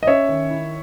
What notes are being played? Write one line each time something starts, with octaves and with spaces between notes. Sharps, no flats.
D#5
C#4 C#5 E5
D#3
E4